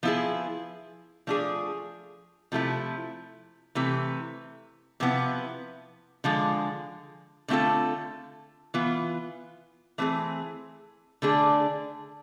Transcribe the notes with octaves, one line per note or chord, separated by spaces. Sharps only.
F3 B3 E4 G#4
F3 A3 D4 G#4
C3 F3 A3 E4
C3 E3 A3
C3 F3 B3 E4
D3 F3 G#3
D3 A3 C4 F4 A4
E3 B3 F4
E3 A3 C4 G#4
D3 A3 D4 G#4